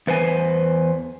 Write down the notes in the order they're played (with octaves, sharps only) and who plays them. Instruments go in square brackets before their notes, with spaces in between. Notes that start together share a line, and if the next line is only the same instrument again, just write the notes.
[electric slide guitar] E2 B4 C5 G#5